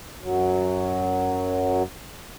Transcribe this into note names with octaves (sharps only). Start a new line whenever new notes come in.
F#2 F#3